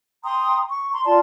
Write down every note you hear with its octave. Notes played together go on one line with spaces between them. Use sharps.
G5 A#5 C6 D#6
C#6
A#5 C6
F4 D5 A5 C6